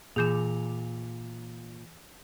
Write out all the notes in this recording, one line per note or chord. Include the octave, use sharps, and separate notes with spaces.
A#2 E3 G#4 G6 E7 F7